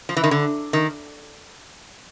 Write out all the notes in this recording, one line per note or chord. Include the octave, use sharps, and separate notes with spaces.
F3
E3
D#3
D3
D#3